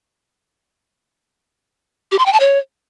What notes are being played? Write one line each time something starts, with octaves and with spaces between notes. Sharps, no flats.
G4
C6
G5
A5
C#5